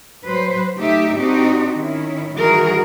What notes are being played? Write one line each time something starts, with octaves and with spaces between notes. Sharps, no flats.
F#3 B4 C5
A3 D#4 G4 E5
C4 D4 D#4 F#4 G4
D#3 C#4 E4
D#3 E3 G3 F#4 G#4 A#4